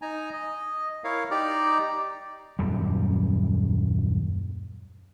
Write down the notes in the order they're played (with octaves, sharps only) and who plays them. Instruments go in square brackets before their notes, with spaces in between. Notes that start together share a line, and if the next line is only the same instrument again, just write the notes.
[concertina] D#4 G#5 A#5
D#5
E4 A#4 C#5 F5
D#4 G4 D5 A#5
[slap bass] D#1 F#2 G3